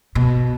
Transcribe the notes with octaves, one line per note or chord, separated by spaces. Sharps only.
B2